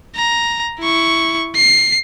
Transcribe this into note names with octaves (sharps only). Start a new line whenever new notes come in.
A#5
E4 C#6
C7